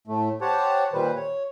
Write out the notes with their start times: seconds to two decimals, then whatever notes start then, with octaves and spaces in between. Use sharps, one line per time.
0.07 A2 A3
0.41 G4 C5 C#5 F#5 A5
0.93 A#2 D#3 G3 B4 C5
1.16 C#5